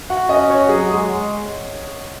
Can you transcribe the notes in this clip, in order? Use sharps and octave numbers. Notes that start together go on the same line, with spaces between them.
F#4 F#5
C#4 D#5
F#4 C#5
F#3 G#4
G#3 G#4
G#3